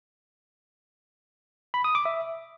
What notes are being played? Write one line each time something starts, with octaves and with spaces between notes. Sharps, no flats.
B5
D#6
D6
E5